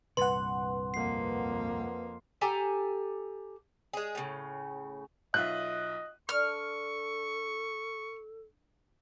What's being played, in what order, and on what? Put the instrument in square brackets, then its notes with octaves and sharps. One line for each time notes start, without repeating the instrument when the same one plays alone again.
[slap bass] C2 G2 A#2 [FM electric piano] B4 F#5 [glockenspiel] C6
[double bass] F2 A#3 [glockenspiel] C7
[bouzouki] G4 A4 G#5 A#5
G#3 G#4
A2 C#3
[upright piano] B1 F4 E5 [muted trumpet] D#5 [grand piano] F#6
[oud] D4 [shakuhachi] A4 [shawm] C#6 [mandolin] F6